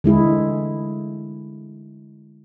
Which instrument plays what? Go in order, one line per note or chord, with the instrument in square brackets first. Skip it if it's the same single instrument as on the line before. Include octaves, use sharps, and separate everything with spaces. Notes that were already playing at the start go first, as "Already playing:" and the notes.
[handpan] D3 G#3 E4 G#4